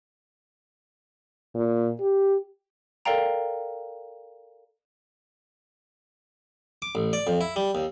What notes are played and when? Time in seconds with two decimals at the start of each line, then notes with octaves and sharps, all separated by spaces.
1.55 A#2
2.00 G4
3.06 A4 A#4 D5 F5 G5 A#5
6.82 D6
6.95 A1
7.13 D5
7.27 F2
7.41 E4
7.56 G3
7.75 D#2